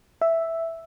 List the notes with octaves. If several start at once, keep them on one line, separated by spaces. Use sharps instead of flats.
E5